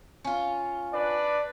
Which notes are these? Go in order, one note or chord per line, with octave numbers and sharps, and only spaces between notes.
C#4 F4
D4 B4 D5